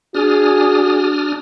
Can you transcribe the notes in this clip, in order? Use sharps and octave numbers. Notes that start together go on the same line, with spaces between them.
D4 F#4 G#4 D#6 F6